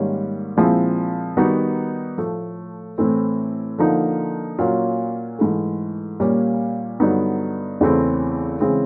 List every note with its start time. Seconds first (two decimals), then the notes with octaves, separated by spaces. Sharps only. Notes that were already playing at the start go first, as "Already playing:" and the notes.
Already playing: G#2 D#3 G3 A#3 C#4
0.57 A#2 F3 G#3 C4 E4
1.37 D#3 G3 B3 D#4 F#4
2.18 A2 F3 A3
2.98 A2 E3 A3 C4 E4
3.78 D3 F3 A#3 D#4
4.59 A#2 F#3 A#3 C#4 F4
5.39 G#2 E3 A3
6.20 A#2 G3 A#3 C#4
7.00 G2 D3 F#3 B3 D#4
7.81 E2 C#3 E3 A3 C4
8.60 C#3 E3 G#3 C4